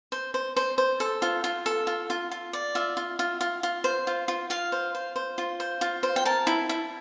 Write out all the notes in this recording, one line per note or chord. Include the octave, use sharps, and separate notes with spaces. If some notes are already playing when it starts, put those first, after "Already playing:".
C5
C5
C5
C5
A4
F4
F4
A4
F4
F4
F4
D5
F4 E5
F4
F4
F4
F4
C5
F4
F4
F4 F5
C5
C5
C5
F4
C5
F4
C5
G5
A#4 A5
E4
E4